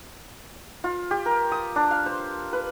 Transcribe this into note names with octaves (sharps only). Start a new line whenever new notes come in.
F4
G4
A#4
D#6
D4
F5
C5
B4